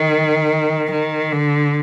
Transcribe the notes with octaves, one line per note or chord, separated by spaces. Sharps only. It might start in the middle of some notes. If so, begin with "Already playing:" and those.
Already playing: D#3
D#3
D3